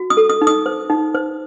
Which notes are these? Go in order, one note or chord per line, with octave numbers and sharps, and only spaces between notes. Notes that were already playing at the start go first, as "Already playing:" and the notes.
Already playing: F#4
D#6
A4
D#6
D#4
D#6
C5
D#4
C5